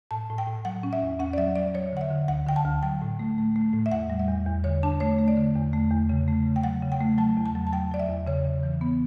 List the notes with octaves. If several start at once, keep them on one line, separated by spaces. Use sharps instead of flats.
A2 A5
A2
G5
A2
F#3 F#5
C#4
E5
E2
C#4 F#5
D5
F#3 E5
F#3 D5
F#3 C#5
D3 F#5
E5
D3
D2 F#5
D3 G5
A5
D2
F#3 G5
A2
A3
A3
A3
A2
E5
E2 F#5
G3
E5
E2
E2
D3 C#5
D4 A5
A3 C#5
A3
D5
D3
E2
A3
E2
C#3
A3
C#3
G5
F#3 F#5
C#3
G5
A3
F#3 A5
E2
A5
F#3
A5
F#3 G5
F#3 D5
E5
E2
C#3 C#5
C#3
E3
B3